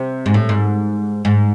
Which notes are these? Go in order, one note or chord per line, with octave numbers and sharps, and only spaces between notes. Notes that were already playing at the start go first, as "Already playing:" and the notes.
Already playing: C3
G#2
A2
G#2
G#2